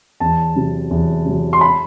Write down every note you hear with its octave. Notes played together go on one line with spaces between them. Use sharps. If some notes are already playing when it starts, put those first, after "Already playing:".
E2 A5
C3 F#3
E2
C3 F#3
C6
B5